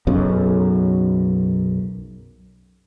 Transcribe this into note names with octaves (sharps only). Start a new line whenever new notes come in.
B1 F#2 C#3